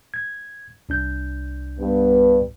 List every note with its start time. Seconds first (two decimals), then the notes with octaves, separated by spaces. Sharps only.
0.14 G#6
0.89 C2 D4 G6
1.79 G2 B3